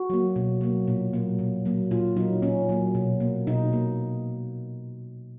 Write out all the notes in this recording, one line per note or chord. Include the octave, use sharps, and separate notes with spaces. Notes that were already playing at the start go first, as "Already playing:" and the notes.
Already playing: F#4
F#3 A#3
B2
F#3 A#3
A#2
F#3 A#3
A#2
F#3 A#3
A#2 F4
F#3 A#3 D#4
A#2 C#4
F#3 A#3
B2
A#3
B2 D#4
A#3